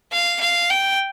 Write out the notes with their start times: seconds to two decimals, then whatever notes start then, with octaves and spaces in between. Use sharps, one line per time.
0.12 F5
0.41 F5
0.70 G5